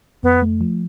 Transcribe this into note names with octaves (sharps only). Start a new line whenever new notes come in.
F2 B3
A3
F3